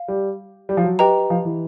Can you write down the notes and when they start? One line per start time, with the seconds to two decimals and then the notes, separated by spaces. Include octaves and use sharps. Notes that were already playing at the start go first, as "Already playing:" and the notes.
Already playing: F5
0.08 G3
0.69 G3
0.77 F3
0.84 F#3
0.99 G4 B4 D#5 G5 A#5
1.30 F3
1.45 E3